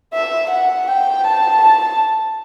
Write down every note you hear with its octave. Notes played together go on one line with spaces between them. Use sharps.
E5
F#5
G5
A5
A5